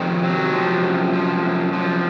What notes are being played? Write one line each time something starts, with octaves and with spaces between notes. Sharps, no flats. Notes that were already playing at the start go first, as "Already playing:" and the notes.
Already playing: F2 C3 D#3 C4
F#3
F3
F#2
F3
F#2
F3